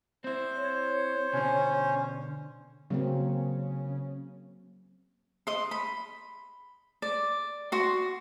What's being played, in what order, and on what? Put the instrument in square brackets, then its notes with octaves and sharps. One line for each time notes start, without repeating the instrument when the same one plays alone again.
[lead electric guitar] C4 E4 [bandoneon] C5
[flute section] C#5
[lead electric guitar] B2 D3 [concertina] C#4
[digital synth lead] C#3 [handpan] F#3 A#3 C4
[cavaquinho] D#5 C6
B5
D5
F#4 C6